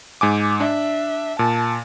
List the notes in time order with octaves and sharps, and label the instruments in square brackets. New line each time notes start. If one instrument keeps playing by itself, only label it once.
[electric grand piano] G#2 G#5 D6
[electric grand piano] D4 [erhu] E5
[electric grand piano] A#2 [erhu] A5